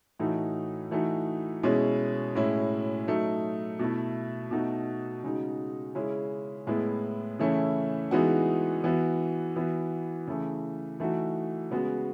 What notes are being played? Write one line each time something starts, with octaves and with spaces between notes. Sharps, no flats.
A2 E3 A3 D#4 F#4
E3 A3 D#4 F#4
B2 G#3 C#4 E4
A2 G#3 C#4 E4
F#3 A3 D#4
B2 A3 E4
B2 A3 D#4 F#4
C#3 G#3 D#4 F#4
C#3 G#3 C#4 E4
A2 G#3 B3 E4
C#3 E3 A3 C#4 E4
E3 G#3 B3 D#4 F#4
E3 B3 F#4
E3 B3 F#4
C#3 E3 A3
E3 A3 D#4 F#4
C#3 G#3 B3 F#4